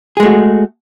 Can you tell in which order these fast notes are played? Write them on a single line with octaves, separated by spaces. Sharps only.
G#4 G#3 A3 F#4